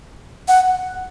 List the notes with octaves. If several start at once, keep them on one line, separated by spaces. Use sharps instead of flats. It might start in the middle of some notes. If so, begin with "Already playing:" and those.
F#5